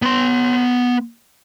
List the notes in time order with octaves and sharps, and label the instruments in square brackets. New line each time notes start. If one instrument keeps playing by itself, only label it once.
[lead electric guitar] B3 C6